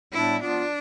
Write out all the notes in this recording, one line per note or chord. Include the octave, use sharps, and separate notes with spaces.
A2 G3 B3 D4 E4
F3 B3 D4 F4